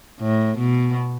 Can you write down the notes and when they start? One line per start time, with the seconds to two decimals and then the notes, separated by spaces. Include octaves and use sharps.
0.20 A2
0.58 B2